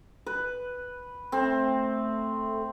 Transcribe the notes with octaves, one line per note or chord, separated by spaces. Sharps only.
B4
A3 C4